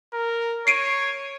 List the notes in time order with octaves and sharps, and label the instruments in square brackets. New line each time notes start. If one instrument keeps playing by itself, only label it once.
[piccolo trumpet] A#4
[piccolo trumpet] C#5 [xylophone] C7 D7 D#7